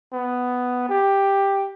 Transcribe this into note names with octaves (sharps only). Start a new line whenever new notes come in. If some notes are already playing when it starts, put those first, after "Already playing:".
B3
G4